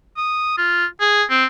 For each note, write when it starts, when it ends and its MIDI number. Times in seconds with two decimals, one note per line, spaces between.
0.17 0.53 87
0.58 0.86 65
1.01 1.24 68
1.30 1.46 60